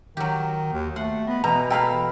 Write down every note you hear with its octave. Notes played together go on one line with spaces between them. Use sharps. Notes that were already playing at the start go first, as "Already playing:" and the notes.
D#3 F#3 G4
D#2
A3 F#5 C6
B3 D#5
B2 E3 A#5
A4 B4 F5 G5 A#5